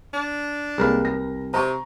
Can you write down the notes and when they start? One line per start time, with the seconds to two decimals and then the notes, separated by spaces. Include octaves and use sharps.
0.14 D4
0.78 C2 G#3 A#3 A#4 B4
1.05 A#6
1.54 C3 A#5 C#6